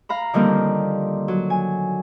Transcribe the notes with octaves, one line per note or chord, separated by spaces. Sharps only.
F5 A#5 B5
D3 D#3 F3 G3 A#3 C4
F#3
G#5